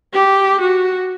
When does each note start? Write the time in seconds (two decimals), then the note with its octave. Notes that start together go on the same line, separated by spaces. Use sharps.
0.14 G4
0.61 F#4